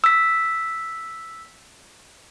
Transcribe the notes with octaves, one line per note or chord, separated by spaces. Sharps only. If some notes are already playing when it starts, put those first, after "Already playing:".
E6 B6